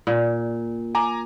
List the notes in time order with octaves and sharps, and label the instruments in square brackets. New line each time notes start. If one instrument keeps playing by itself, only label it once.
[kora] A#2
[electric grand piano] G#5 A#5 D6